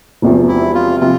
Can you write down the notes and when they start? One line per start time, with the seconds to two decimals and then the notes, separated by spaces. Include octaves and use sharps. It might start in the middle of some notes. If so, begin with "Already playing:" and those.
0.22 E1 E2 C3 F3
0.48 E4
0.74 F4
1.00 C3 F3 F4